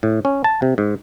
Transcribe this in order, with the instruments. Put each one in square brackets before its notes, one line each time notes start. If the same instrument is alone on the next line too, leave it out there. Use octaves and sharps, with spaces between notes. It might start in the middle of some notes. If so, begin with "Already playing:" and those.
[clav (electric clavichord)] A2
C#4
A5
C3
G#2